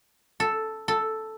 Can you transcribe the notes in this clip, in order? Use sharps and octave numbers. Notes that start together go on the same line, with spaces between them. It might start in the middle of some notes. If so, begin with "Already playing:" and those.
A4
A4